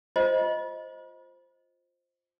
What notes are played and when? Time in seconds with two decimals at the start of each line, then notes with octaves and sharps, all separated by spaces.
0.16 F4 C5 D#5